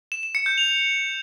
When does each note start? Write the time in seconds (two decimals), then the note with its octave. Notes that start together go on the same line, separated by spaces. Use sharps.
0.12 E7
0.23 E7
0.35 C#7
0.46 G6
0.58 F7